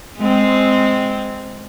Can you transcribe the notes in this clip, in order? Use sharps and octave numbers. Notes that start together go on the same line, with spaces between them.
G#3 C4